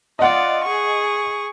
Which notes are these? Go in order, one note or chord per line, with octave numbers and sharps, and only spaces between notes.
F4 D5 D#5 F#5
G#4 C#6